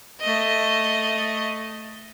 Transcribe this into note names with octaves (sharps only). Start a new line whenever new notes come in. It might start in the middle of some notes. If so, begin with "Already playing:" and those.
A3 D#5